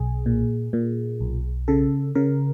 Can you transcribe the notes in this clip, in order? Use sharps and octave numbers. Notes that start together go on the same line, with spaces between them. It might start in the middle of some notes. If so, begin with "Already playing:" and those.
Already playing: B1 G#4
A#2
A#2
B1
C#3 A4
C#3 A#4